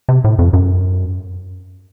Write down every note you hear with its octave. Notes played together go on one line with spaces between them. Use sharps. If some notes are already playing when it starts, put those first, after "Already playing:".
C3
A2
F2
F#2